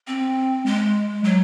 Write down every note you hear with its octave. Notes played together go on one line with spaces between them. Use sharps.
C4
G#3
F#3